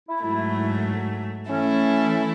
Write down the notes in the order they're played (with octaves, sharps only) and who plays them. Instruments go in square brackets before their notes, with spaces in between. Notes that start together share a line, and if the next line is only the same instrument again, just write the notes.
[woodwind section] E4
[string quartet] G#2 F#3 A3 [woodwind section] E4
[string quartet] E3 A3 E4 A4 [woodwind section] C#4
[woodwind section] C#4